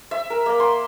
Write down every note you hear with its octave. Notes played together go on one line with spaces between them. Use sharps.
E5
A#4
A#3
C6